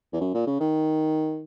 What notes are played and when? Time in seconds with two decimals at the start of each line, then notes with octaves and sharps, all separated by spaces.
0.13 E2
0.21 F#2
0.34 A#2
0.47 C#3
0.61 D#3